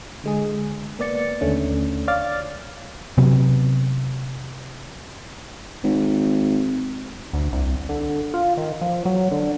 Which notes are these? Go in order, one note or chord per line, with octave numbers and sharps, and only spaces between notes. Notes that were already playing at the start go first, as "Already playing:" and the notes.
D3 G#3 G#4
A#3 B3 D5 A6 C#7
D#2 D3 A3 C#4 D4
C#5 D5 F5 D6 F6 A6
C3 F#3 B3
G#1
D2
C2
D3
F4
D#3
F3
F#3
D3